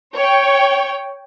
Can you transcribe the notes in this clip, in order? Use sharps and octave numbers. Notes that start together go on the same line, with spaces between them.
C#5 G5